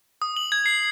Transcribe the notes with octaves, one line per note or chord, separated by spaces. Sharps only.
D#6
F#7
G#6
C7